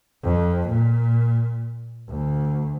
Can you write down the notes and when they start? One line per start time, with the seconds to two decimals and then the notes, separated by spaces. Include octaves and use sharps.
0.24 F2
0.69 A#2
2.09 D2